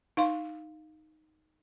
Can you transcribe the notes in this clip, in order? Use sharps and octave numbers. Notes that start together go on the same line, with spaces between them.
D#4 F5 C6